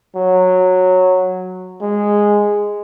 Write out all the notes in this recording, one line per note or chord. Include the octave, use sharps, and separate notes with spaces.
F#3
G#3